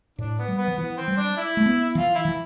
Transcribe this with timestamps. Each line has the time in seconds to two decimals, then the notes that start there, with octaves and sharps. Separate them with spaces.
0.18 A2 D4
0.39 B3
0.48 G3
0.58 B3
0.68 F3
0.77 E3 B3
0.97 C4
1.08 G3
1.17 D4
1.37 E4
1.57 A3
1.66 B3
1.95 E3 F4
2.15 E4
2.25 E3